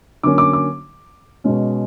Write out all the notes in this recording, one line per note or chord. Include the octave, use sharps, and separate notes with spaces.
D3 F#3 A#3 C#4 D6
D6
D6
B2 G#3 C#4